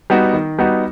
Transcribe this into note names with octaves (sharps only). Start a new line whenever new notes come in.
G3 B3 D#4 F#4
D#3
G3 B3 D#4 F#4